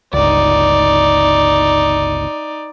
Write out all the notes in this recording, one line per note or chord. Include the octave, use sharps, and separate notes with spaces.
G1 C#2 D#4 D5